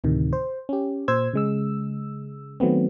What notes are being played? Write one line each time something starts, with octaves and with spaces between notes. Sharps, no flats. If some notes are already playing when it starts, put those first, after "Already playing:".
D2 A2 C3 D#3
C5
C#4 G4
A#2 C5 E6 G#6
C#3 G#3 E6
D#3 F#3 A3 B3 C4